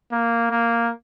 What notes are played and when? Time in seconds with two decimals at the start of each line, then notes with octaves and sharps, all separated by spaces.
0.12 A#3
0.51 A#3